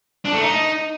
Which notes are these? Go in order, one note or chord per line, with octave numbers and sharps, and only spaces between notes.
D4
A3
D#4